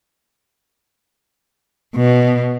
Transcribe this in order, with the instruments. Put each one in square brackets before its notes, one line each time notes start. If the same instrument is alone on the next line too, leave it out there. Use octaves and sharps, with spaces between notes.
[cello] B2